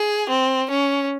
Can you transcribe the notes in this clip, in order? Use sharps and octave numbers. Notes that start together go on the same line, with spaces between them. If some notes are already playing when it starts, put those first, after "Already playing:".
Already playing: G#4
C4
C#4